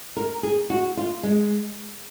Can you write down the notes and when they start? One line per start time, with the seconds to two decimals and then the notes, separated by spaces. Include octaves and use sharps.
0.17 A#4
0.43 G#4
0.70 F#4
0.97 F4
1.23 G#3